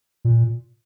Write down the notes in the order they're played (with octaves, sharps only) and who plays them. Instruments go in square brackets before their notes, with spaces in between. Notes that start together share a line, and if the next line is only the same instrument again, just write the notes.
[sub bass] A#2